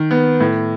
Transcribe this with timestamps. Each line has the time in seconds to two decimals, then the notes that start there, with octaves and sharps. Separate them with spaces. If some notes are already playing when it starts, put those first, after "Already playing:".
Already playing: D#3
0.11 B3
0.40 A2